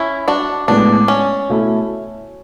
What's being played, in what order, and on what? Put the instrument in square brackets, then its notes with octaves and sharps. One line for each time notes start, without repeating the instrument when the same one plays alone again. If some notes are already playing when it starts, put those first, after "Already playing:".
Already playing: [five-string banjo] C#4 E4
D4 F#4
[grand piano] A2 G#3 B3 [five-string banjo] D4
[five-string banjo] C#4
[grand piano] B2 A3 E4